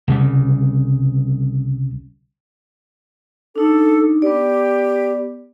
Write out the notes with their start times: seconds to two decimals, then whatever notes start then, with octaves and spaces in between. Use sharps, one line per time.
0.08 C2 C#3 G3
3.56 D4 D#4 A4
4.22 B3 G4 D5